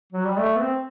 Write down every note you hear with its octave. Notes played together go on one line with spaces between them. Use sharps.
F#3
G3
A3
B3
C4